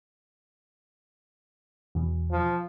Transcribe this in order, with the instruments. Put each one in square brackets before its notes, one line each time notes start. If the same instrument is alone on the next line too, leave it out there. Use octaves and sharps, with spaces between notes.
[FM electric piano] E2 B2
[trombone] F3